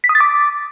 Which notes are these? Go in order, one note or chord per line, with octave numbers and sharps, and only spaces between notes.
B6
D#6
A6
D6